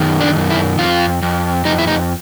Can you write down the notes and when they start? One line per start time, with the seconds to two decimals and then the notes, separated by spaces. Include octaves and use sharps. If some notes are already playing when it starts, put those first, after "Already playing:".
Already playing: F#2 D#3
0.21 D4
0.36 F#2
0.50 E4
0.79 F2 F4
1.22 F2
1.65 F2 D#4
1.78 E4
1.87 D#4